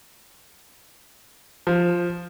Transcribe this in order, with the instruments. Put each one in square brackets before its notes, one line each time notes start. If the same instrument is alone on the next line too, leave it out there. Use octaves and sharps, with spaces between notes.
[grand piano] F3